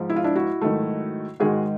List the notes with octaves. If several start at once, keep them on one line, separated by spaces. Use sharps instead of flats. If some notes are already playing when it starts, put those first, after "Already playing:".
Already playing: G#2 F3 G#3
E4
F4
D4 E4
E4 F#4
G#2 D#3 F#3 A3
G#2 D#3 G#3 F#4 G#4